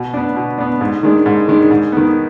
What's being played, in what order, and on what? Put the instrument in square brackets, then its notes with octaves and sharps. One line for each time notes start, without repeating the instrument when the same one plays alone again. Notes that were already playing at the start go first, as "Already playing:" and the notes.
Already playing: [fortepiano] B2
B3 D4
B2
B3 D4
G#2
D#3 G#3 D4
G#2
D#3 G#3 D4
G#2
D#3 B3